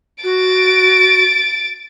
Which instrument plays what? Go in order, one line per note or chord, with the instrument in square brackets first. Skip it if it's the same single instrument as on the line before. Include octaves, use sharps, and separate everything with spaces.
[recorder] F#4 [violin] A6 D7